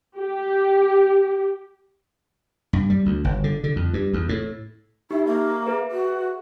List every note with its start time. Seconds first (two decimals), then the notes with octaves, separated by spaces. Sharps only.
0.16 G4
2.73 G2
2.90 G3
3.05 D2
3.24 G1
3.44 D3
3.64 D3
3.76 F2
3.93 G2
4.14 E2
4.29 A2
5.11 D#4 E4 G4 C#6
5.26 A#3 E5
5.66 G#4 B4 E5
5.91 F#4